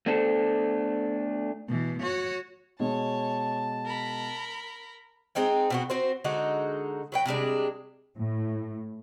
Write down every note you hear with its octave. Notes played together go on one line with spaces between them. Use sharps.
A3 B3 D4 A4 C5
B2 E3
F#4 C#5
B2 G#3 C#5 A5
A#4 B5
G#3 C4 D#4 G5
B2 C4 F#4
C4 F#4 C5
D3 G#3 D#4 F#4
F#3 B4 G5
C3 G3 G#3 D4
A2